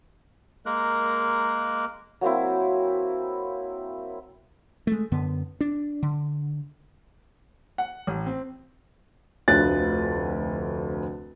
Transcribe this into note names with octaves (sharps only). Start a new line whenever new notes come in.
G#3 A#3 A#4 F#6
F#3 A#3 C4 E4
G#3 A3
F#2 D3 B3
D4
D3
F#5
A1
C4
F1 D2 D3 F3 F#6 A6